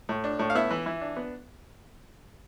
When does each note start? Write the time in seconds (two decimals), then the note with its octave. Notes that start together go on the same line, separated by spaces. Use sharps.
0.09 A2
0.24 D4
0.39 A2
0.50 F5
0.55 B3 E4 E5
0.71 E3
0.86 E3
1.01 D4
1.17 B3